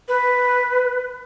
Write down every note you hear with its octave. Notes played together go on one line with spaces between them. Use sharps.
B4